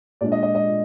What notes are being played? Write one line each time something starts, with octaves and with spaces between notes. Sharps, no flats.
A#2 G#3 D4 D5
D#5
D#5
D#5